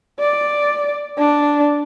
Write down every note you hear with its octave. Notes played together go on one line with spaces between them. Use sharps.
D5
D4